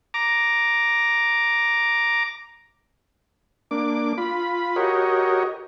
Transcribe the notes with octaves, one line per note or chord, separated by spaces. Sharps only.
A#5 D6
A#3 D4 D6
F4 B5
F#4 G4 A#4 C#5 D#5